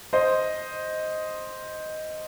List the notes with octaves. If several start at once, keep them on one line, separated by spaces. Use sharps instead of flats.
C5 D#5